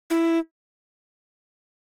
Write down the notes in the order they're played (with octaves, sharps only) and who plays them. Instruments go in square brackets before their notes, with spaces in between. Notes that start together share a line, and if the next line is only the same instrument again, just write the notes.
[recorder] E4